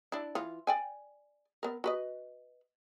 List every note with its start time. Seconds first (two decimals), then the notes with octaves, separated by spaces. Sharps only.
0.12 D4 E4
0.35 E3 F4
0.67 D5 G5 G#5
1.63 B3 A#4
1.84 F#4 B4 D#5